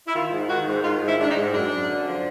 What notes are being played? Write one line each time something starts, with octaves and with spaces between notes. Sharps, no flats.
E4
D#3 F4
G#2
D#3 F#4
G#2
D#3 F4
G#2
E4
D#3 D4
D#4
G#2
F#2 D4
F#2
D3
F3